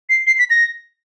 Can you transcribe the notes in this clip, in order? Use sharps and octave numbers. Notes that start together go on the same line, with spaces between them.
C7
C7
B6
A#6